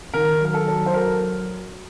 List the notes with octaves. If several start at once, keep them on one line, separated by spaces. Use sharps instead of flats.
D#3 A#4
F#3 A#4
A4
F#3
C5
F#3 A#4